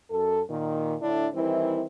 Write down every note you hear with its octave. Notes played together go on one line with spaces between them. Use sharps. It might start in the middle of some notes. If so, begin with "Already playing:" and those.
F#2 A4
A#2 D#3
A2 D3 D4 E4
D#3 E3 G3 C4 E4